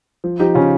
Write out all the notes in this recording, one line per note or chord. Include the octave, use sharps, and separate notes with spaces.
F3
F3 D#4 G4
C#3 C#4 F4